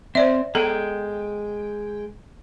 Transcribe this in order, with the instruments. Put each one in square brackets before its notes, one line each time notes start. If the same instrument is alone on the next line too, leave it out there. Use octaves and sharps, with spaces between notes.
[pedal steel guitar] C4 [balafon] C5 D5 E5
[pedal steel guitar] G#3 G5 [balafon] B3 A4 A#5